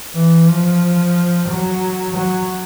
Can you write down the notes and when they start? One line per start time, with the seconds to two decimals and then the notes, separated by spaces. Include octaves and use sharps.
0.14 E3
0.48 F3
1.48 F#3
2.14 F#3